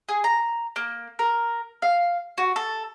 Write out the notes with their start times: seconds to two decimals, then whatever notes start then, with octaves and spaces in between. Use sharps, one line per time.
0.09 G#4
0.24 A#5
0.76 A#3
1.19 A#4
1.82 F5
2.38 F#4
2.56 A4